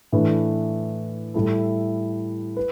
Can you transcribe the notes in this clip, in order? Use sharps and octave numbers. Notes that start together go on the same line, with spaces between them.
A2 E3 A3 D4 B4
A2 G3 E4 A4
B4